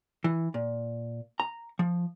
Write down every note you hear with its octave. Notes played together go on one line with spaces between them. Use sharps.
E3
A#2
A#5
F3